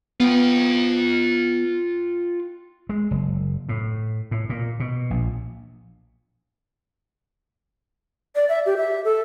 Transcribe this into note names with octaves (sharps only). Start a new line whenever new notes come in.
B3 F4 G5
G#3
F#1
A2
A2
A#2
B2
A#1
D5
E5
G4
E5
A4